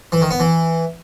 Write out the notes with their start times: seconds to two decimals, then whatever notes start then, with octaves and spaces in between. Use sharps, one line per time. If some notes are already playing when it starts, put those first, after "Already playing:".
0.12 E3
0.22 D#3
0.31 B3
0.40 E3